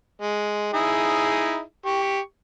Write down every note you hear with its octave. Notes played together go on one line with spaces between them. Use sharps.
G#3
D#4 E4 G#4
G4 C#6